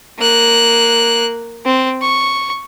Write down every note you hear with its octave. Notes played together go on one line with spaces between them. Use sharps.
A#3 F#6
C4
C#6